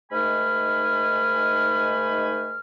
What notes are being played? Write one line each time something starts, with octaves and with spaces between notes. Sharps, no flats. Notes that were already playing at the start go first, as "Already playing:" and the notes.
G#2 D#3 A3 G#5 B5 F6